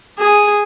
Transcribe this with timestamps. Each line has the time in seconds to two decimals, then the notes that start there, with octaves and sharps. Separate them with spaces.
0.18 G#4